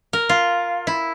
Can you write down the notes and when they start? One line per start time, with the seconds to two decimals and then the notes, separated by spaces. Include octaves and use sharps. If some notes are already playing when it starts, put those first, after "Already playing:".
0.13 A#4
0.29 F4
0.87 E4